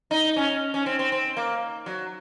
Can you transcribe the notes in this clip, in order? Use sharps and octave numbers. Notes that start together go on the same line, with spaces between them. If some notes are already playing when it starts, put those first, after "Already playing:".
D#4
C#4
C#4
C4
C4
C4
A#3
F#3